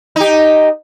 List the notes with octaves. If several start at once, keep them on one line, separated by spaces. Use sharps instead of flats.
D#4 G4